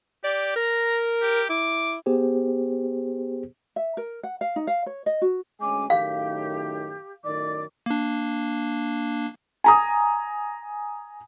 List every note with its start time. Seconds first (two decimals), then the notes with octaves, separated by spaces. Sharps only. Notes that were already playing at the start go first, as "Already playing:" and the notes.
0.24 G4 D5
0.56 A#4 A#5
1.22 G4
1.50 E4 D6
2.06 B3 G4 G#4 C5
3.76 E5
3.97 A#4
4.23 F#5
4.41 F5
4.56 D#4
4.67 F5
4.86 C#5
5.06 D#5
5.22 F#4
5.60 D2 G#3 C#4 G#5 D6
5.90 F#2 A2 D#3 G4 F5
7.24 F#2 A2 D#3 D5 D6
7.86 A#3 D4
9.64 G#5 A#5 D#6